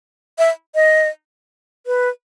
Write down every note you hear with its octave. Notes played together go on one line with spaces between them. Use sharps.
E5
D#5
B4